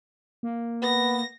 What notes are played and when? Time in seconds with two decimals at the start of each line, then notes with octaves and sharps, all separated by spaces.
0.43 A#3
0.82 B3 A#6